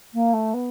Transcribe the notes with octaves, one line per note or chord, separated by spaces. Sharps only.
A#3
A3
B3